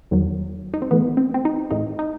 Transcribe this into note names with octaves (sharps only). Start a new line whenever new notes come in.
E2 D#3 F#3
D#4
C4
A2 E3 B3
C4
C4
D#4
A2 E3 D#4
D#4